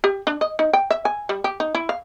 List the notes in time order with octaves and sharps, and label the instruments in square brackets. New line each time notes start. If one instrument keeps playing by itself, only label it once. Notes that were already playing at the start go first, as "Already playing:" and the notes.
[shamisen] G4
D4
D#5
D#4
G5
E5
G#5
G3
G4
D#4
E4
F5